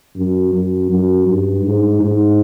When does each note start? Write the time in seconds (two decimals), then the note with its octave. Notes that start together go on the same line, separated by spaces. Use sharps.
0.17 F#2
0.54 F#2
0.90 F#2
1.28 G2
1.65 G#2
2.01 G#2